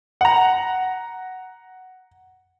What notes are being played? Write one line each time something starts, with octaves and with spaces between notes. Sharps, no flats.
F#5 A#5